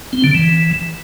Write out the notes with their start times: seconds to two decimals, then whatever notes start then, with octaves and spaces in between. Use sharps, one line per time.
0.13 C4
0.24 D3
0.35 E3